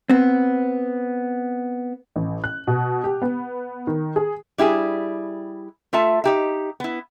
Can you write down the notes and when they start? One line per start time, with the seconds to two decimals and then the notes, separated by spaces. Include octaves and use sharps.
0.10 B3 C4
2.16 A1
2.44 F#6
2.67 B2
3.04 G4
3.22 B3
3.87 D#3
4.16 G#4
4.58 G3 E4 G4 G#4
5.93 A3 F4 A4 E5 A5
6.24 D#4 G4 E5
6.80 B3 E4